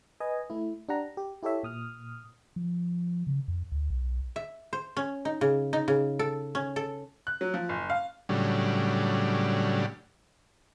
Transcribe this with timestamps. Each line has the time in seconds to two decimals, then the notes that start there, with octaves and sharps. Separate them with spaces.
0.20 B4 D#5 G#5
0.50 A3 E4
0.89 D4 G4 F#5 A#5
1.17 G4
1.43 E4 G4 A4 C#5 E5
1.63 A#2 D#6 F6
2.56 F3
3.27 C#3
3.48 F2
3.72 D2
3.90 B1
4.36 E5
4.73 C5
4.97 C#4
5.25 D#4
5.41 C#3
5.73 D#4
5.88 C#3
6.19 A4
6.55 C#4
6.76 A4
7.27 F#6
7.41 F#3
7.54 F3
7.69 F#1
7.90 F5
8.29 A2 C#3 F#3 G3 D4